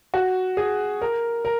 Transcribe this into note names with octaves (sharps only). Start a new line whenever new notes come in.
F#4
G#4
A#4
A#4